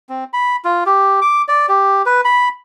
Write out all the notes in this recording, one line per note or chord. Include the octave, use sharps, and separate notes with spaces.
C4
B5
F4
G4
D6
D5
G4
B4
B5